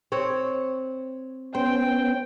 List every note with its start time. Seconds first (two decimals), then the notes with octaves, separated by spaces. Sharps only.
0.12 C4 C#5
1.55 B3 C#4 C5 G5